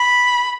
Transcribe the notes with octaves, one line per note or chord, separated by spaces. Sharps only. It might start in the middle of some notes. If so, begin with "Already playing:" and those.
Already playing: B5